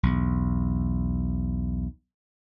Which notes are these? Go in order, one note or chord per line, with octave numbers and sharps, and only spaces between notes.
B1 E2